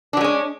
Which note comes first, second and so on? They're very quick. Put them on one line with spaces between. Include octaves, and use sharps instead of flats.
D4 F#3 G#3 C#4